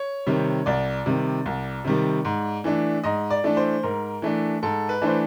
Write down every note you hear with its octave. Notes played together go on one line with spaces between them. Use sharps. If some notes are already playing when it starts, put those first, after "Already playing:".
Already playing: C#5
C3 D#3 G3
C2 D5
C3 D#3 G3
C2
C3 D#3 G3
G#2
E3 A3 D4
G#2 D#5
D5
E3 A3 D4
C5
G#2 A#4
E3 A3 D4
G#2 A4
B4
E3 A3 D4 C5